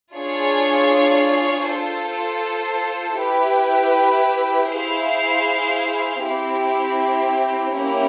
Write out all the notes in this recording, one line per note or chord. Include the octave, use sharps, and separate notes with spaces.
D4 F4 G#4 C#5
F4 A4 C5
E4 G4 B4
E4 G#4 C5 F5
C4 E4 G4
A#3 C#4 E4 G4 A#4